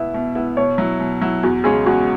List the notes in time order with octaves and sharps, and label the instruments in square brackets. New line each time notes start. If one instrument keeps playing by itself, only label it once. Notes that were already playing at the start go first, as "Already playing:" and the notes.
Already playing: [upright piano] B2 B3 E4 [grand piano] E5
[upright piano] B2
B3 E4
[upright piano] B2 [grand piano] C#5
[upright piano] F#3 E4
B2
F#3 E4
[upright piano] E2 [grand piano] F#4
[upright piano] C#3 G#3 C#4 [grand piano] G#4
[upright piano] E2 [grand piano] F#4